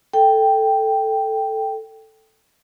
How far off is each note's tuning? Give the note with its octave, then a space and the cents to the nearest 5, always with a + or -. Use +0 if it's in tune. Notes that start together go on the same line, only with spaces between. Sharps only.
A4 +0 G5 +0